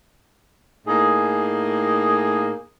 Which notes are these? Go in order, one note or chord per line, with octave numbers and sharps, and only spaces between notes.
A2 A#3 D#4 G#4